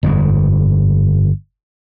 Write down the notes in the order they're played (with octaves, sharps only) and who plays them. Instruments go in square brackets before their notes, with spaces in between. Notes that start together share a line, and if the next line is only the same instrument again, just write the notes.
[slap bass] G1 F2 G#2